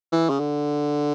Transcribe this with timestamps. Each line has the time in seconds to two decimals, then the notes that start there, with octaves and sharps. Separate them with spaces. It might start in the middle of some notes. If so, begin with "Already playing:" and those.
0.12 E3
0.30 C#3
0.39 D3